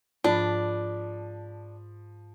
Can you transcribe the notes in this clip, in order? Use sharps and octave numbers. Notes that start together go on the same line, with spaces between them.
G#2 F3 D4 B5